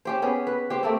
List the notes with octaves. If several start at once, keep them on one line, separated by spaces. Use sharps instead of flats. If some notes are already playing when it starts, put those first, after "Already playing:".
C#4 G4 C5
B3 C#4 G#4
B4
G4 C5
A3 A#3 C4